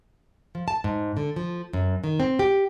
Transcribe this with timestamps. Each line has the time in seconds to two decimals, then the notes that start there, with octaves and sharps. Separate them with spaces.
0.55 F3
0.68 A5
0.84 G#2
1.17 D3
1.36 F3
1.73 F#2
2.04 D#3
2.20 C4
2.39 G4